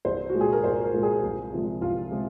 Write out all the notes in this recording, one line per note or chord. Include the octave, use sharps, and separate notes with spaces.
C2 C5
F#4
A#2 G#3
G#4
A#4
C2 C5
A#4
A#2 G#3
G#4
C2
C3 F3 G#3
C2 F4
C3 F3 G#3